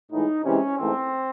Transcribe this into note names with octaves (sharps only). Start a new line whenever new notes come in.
A2 E3 G#3 D#4
C3 E3 G#3 C#4
G#2 E3 A3 C4